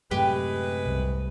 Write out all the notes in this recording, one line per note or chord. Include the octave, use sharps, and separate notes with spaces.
F#2 A2 C3 G#3 G4 B4
C2